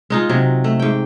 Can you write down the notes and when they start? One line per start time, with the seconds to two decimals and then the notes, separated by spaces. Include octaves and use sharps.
0.10 G#3 D#4 F4
0.29 C3 F#3
0.64 A3
0.79 G#2 G5